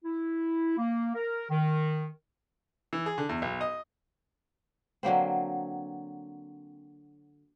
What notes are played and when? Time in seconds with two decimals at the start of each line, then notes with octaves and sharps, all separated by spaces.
0.05 E4
0.78 A#3
1.15 A#4
1.50 D#3
2.93 E3
3.06 G#4
3.18 D3
3.29 E2
3.42 B1
3.61 D#5
5.03 D3 F#3 A#3 C4